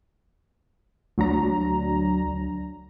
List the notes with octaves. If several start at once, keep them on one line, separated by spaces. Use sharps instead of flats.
D2 F#3 D4 A#5